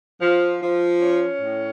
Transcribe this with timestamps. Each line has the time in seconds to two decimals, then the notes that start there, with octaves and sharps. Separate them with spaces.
0.21 F3
0.61 F3
1.01 C#4
1.41 A2